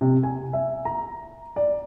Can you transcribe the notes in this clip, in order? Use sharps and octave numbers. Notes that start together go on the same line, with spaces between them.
C3
G#5
E5
A#5
D5